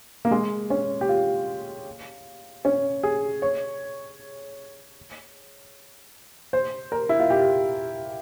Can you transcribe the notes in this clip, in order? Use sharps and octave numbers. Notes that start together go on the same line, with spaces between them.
A#3
G#3
C#4
G4
F4
C#4
G#4
C#5
C5
A#4
E4
F4
G4